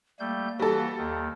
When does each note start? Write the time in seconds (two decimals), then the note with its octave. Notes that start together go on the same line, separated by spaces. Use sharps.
0.20 G3 A3 A#3 G6
0.59 E3 G3 F#4 A4
0.97 D#2 D#3